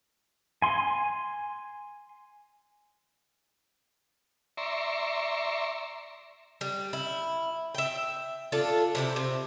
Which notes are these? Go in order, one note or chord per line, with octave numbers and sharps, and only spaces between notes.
G#5 C6
D5 E5 A#5 C6 C#6
G3
E4
E5 G5
D4 F4 A4
C3 E4 G4
C3